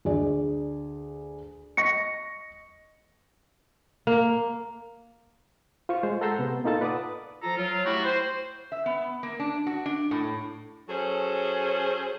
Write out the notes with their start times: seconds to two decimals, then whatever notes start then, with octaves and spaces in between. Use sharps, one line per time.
0.05 D2 G#4 D5
1.77 D#5 C#6 A#6 C#7
4.07 A#3
5.89 F4 C5 C#6
6.03 G#3 C5
6.21 A4 F#5 A#5 C6 E6 G6
6.39 C3 B3
6.64 A#3 D#4 F4 A4 A5
6.81 B4 D5 F#5 D6 D#6
7.43 F3 F4 A4 A#5
7.57 F#3 F4
7.85 A3 E4 F#4 G4
8.05 C5
8.72 E5
8.86 B3
9.23 A#3
9.39 D4
9.66 F#4
9.86 D4
10.11 A2
10.89 F#3 C#4 G#4 A4 C5